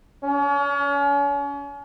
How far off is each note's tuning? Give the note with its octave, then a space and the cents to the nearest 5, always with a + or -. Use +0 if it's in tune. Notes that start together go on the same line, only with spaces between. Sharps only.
C#4 +35